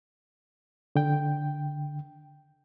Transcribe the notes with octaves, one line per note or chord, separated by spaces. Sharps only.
D3 G5